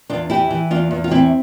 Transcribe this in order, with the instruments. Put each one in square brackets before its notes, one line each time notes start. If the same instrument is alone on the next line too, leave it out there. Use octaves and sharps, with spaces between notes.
[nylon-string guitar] E2 D4 F4
E3 E4 G4
E3
E2 D4 F4
E2
F4
E3 C4 E4